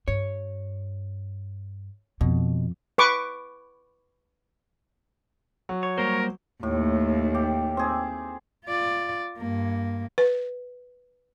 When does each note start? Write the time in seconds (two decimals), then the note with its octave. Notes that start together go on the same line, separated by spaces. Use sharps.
0.08 G2 C#5
2.21 F2 B2
2.98 B4 C#6 D6
5.69 F#3
5.83 C#5
5.98 G3 A#3 A#4 C5
6.63 D#2 A2
7.35 G4
7.77 C4 G#4
8.65 F4 D5
9.37 G2 A#3
10.18 B4